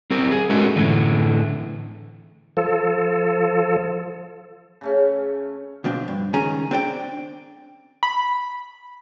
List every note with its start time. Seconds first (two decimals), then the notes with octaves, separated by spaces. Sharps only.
0.11 C4 G4 A#4
0.31 G#4
0.50 G#3 A3 C#4 D#4 F#4 A#4
0.76 A2 D3 E3 A3
2.57 F3 A4
4.81 C#3 A3 C#4
5.84 B2 F3 C4 D4
6.08 G2
6.33 C#2 D#3 C#4 G#4 G#5 A#5
6.71 C4 D4 D5 G5
8.03 B5